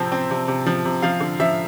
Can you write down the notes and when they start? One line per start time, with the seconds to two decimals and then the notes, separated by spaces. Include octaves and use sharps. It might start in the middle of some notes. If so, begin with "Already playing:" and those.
Already playing: C3 F3 C4 A5
0.12 C4
0.30 C3
0.48 C3
0.66 F3
0.85 C3
1.02 F3 F5
1.20 D3
1.40 F3 E5